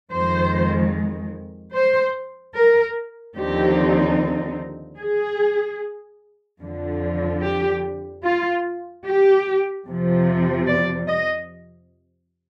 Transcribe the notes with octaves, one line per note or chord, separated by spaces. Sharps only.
F2 D#3 G#3 C5
C5
A#4
D#2 D3 F3 C4 D#4 G4
G#4
F2 D3 F3
G4
F4
G4
F2 C3 F3
D5
D#5